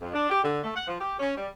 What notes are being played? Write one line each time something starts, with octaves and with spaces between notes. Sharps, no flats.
F2
D4
G4
D3
A3
F#5
F3
G4
C#4
G3